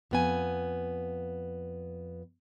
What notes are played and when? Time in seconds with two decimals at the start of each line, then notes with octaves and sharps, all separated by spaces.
0.11 F2 B3 G#5